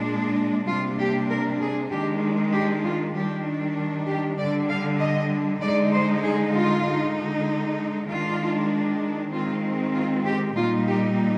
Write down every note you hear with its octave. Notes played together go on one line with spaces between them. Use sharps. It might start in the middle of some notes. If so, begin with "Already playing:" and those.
Already playing: A#2 G#3 D4
C3 G3 A#3 D4 F4
G4
A#4
G#4
D#3 G#3 D4 G4
G4
F4
D#3 G3 D4 G4
G4
D3 G3 D4 D5
F5
D#5
D3 G#3 D#4 D5
C5
G#4
F4
D3 G#3 D#4
D#3 G#3 D4 F4
D#3 G#3 C4 F4
F4
G4
A#2 G3 A#3 D#4 F4
G4